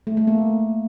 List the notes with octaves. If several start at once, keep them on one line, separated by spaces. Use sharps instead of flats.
A3
A3
A#3